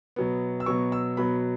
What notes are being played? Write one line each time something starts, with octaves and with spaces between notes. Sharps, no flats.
B2 F#3 B3
E6
B2 F#3 B3 C#6
E6
B2 F#3 B3 B5